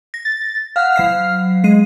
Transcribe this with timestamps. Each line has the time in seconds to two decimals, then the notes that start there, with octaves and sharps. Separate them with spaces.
0.14 A#6
0.25 A6
0.76 F5 F#5 F6 F#6
0.96 F#3 F5 C7
1.64 G#3 C7 D#7